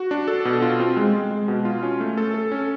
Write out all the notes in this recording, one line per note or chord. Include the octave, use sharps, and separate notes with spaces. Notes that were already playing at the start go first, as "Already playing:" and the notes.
Already playing: F#4
D4
A4
B2
F4
C4
G#3
G#3
G#3
B2
F4
C#4
A3
A4
A4
C#4